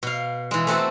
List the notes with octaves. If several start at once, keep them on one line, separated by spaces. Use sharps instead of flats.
B2 F5
E3 G#3
A3 B3 C4 F#4 A4